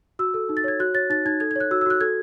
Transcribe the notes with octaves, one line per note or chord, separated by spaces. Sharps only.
F#4 E6
A4
D#4
A6
C#5 G#6
F#4 F#6
C#5 A6
D#4 A6
D#4 G#6
A4 G#6
G#6
C#5 F#6
F#4 E6
E6
F#4 F#6
A4 G#6